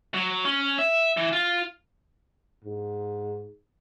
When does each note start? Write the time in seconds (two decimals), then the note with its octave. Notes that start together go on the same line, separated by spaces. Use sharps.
0.14 F#3
0.45 C#4
0.78 E5
1.17 E3
1.33 F4
2.64 G#2